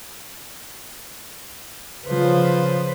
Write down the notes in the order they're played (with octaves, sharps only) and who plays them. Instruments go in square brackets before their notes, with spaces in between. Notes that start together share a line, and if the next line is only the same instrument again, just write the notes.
[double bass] C#3 F3 [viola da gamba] B4 C5